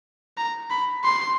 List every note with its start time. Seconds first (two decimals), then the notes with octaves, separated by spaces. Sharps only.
0.38 A#5
0.71 B5
1.04 C6